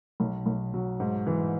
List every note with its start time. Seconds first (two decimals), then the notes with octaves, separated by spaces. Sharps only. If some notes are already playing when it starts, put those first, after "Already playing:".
0.20 B1
0.46 B1
0.74 F#3
1.00 G#2
1.27 E3